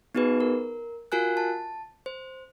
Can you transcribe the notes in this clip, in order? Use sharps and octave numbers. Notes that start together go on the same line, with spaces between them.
B3 D#4 F#4 G#4 B4
A#4
F4 F#4 A#4 G#5 F#6
A5
C5